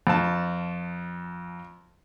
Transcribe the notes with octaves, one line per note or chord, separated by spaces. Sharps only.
F2 A5